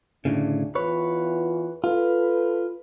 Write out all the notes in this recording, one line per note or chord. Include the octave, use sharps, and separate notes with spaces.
D2 A2 C#3 D4
E2 E3 F4 B4 C#5
F4 A4 B4